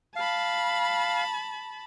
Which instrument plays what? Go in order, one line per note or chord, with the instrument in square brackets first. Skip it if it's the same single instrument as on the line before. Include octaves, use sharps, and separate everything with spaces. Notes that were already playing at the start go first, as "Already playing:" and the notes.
[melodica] F5 [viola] A5 B5